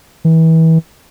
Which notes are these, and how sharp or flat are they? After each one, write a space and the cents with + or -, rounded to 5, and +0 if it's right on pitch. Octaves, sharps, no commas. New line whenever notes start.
E3 -30